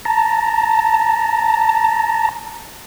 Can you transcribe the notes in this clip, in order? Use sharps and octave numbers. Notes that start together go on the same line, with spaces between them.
A5 A#5